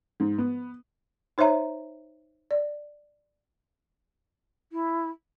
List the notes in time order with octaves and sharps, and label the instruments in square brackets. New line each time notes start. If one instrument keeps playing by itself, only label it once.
[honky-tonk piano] G#2
B3
[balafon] D#4 C5 C#5 E5 A#5
D5
[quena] E4